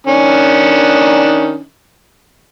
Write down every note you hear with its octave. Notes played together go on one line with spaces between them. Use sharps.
D#3 C#4 D4